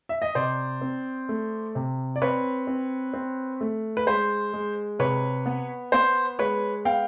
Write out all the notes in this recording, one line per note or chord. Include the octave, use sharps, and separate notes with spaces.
E5
D#5
C3 C5 D5
C4
A3
C3
D5
C4 B4 C#5
C4
C4
A3
B4
G#3 C5
G#3
C3 B4 C#5
B3
B3 C5
G#3 B4 C#5
B3 F5 G5